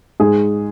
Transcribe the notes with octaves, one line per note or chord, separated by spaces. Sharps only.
G#2 G#4